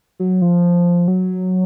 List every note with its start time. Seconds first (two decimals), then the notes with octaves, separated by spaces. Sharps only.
0.20 F#3
0.42 F3
1.08 F#3